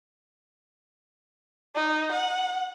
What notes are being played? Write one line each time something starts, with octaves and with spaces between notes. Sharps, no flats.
D#4
F#5